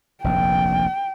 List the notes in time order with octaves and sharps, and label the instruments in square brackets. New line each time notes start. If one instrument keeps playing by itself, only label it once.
[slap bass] F1 A#1 D#2 [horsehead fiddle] G5